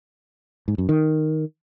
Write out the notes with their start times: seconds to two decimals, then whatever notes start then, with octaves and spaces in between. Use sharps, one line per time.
0.68 G#2
0.78 F#2
0.89 D#3